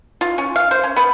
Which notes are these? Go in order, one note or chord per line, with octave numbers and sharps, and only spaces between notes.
F4
C#4
F5
C5
C#4
B3